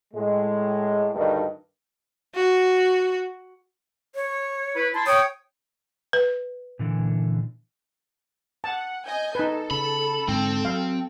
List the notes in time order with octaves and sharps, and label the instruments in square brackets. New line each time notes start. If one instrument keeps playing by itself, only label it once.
[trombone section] A2 G#3
D2 G2 D#3 A3 D4 D#4
[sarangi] F#4
[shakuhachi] C#5
[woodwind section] E4 B4
E4 A5 C6
[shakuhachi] C#5 [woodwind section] G5 D#6
[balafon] B4
[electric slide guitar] A#2 D3 E3
[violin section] F#5 [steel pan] A5
[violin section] D#5 G#5 G6
[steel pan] D#4 B4 [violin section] A4
[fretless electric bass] C#3 [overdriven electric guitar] B5
[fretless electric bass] G#2 D3 [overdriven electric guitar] C4
[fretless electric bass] F#3 [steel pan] F5